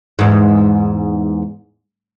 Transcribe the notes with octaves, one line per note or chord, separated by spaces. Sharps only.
E2 G#2